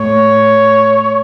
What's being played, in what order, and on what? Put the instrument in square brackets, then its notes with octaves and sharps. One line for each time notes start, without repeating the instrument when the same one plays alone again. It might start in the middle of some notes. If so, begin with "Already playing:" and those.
Already playing: [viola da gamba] A2 [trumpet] C#5